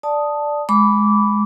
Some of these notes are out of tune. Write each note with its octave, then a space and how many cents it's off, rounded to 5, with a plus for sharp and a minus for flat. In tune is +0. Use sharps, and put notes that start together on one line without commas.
D5 +0 A5 +0 D#6 +0
G#3 +10 B5 +0 D6 -20